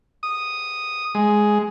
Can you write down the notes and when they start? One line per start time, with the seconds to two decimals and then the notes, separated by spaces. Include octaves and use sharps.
0.23 D#6
1.15 G#3